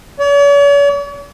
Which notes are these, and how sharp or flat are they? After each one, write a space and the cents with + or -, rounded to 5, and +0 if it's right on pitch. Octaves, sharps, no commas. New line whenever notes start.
C#5 +45